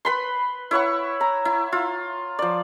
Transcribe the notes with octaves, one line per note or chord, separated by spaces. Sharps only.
B4 B5 C6
E4 C#5 F#5 C#6
A#5
E4
F4
F3 D5